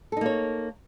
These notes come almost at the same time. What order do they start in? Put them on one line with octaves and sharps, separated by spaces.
A4 D#4 A#3 C#5